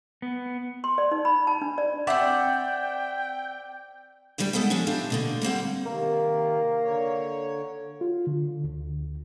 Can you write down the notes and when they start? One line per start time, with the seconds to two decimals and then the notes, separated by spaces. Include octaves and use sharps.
0.22 B3
0.84 C6
0.98 D5
1.11 D#4
1.25 B5
1.47 A5
1.61 D4
1.78 D5
2.07 C4 D5 E5 F#5 G5
4.38 D#2 D3 E3 G3 G5
4.53 G#3 B3 A4 F#5 G5
4.70 F3 C#4 D4
4.87 C4 D4 E4 F4 G4 A4
5.10 B2 D3 A#3
5.41 G3 A#3 C4 F#5
5.86 C3 D#3 A#3
6.83 D3 C#5
8.01 F4
8.27 D3
8.64 D2